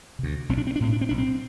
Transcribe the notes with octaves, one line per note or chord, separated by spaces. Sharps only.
D2 C3
B1 C4
D4
C4
D4
A2 C4
D4
C4
B1 D4
C4